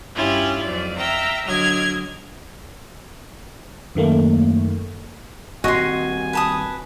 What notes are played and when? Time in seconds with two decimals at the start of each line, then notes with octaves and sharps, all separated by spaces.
0.14 G2 C#4 E4 F4 G4
0.62 F2 F#3 D5
0.97 E5 F5 G5 A#5
1.45 D3 F#3 D#5 F6 G#6
3.95 F#2 D#3 A3 A#3
5.64 D#1 C4 F#4 D#5 G#5 C6
6.33 B4 A5 D#6